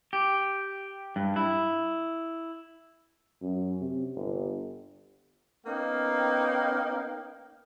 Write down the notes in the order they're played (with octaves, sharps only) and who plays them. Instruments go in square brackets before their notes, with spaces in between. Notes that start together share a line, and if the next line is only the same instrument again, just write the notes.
[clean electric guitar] G4
G2
E4
[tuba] F#2
C3
G1
[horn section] A#3 B3 C#4 D#4 F5 G5